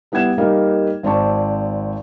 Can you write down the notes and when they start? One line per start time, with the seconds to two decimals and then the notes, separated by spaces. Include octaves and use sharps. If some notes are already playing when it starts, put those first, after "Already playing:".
0.12 G3 B3 E4 F#5 G#6 E7
0.38 G3 A#3 D#4 F5
1.03 G#1 C4 C5 D5 A5 C#6